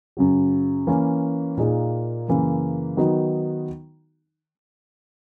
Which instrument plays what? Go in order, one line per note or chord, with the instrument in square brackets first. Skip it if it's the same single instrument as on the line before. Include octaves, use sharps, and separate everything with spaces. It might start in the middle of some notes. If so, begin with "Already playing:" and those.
[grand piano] F#2 C#3 F#3
E3 A#3 C#4
A#2 A#3 D#4 G#4
F#2 C#3 E3 A#3
D#3 F#3 B3 D#4 F#4